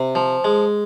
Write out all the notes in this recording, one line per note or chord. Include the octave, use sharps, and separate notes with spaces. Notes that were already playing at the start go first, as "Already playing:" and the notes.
Already playing: C3
F3
G#3